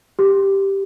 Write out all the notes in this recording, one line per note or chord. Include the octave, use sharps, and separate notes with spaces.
G4